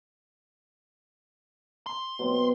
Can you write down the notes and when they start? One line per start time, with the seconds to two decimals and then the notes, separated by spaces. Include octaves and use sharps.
1.86 C6
2.19 B2 F#3 C4